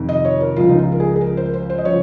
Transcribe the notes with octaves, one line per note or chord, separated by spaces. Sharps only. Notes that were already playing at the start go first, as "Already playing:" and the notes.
Already playing: F2 C3 D#3
D#5
C#5
A#4
C#2 C#3 F3 F4
D#4
F4
A#4
G#4
G#4
A#4
C5
A#4
C5
C5
D#5
C#3 F3 C#5